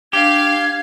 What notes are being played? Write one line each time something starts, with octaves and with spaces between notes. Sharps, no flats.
D4 G4 F5 G#6